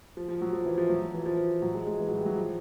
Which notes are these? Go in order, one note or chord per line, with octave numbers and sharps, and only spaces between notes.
F3
F3
F#3
F3
E3
F3
F#3
F3
E3
F3
F#3
G#3
G#3
E3
F#3
G3
F#3
F3